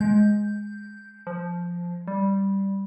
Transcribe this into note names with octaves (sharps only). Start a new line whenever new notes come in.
G#3 G6
F3
G3